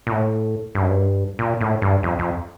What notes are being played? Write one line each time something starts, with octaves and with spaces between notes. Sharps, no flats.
A#2
A2
G2
F#2
G2
A#2
A2
G2
F2
F2